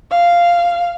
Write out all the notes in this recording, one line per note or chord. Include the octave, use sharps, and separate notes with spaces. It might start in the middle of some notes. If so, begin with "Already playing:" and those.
F5